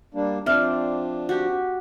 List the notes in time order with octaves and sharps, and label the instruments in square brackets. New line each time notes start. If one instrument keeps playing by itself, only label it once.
[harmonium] G3 A#3 D4
[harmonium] F3 D4 [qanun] C4 D5 [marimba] E5 F6
[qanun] F#4 G4